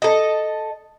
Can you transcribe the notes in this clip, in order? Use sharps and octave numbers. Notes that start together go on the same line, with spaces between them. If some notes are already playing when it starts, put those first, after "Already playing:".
A4 D#5